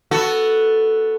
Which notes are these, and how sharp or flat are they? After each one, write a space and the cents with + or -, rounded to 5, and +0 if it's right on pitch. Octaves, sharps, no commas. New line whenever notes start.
B3 +0 F#4 +0 A4 +0